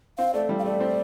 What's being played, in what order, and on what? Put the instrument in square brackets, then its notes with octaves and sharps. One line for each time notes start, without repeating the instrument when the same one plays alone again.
[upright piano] C4 [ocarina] F5
[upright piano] A3 [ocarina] D5
[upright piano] G3
[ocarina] F5
[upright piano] A3 [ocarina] D5
[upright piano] C4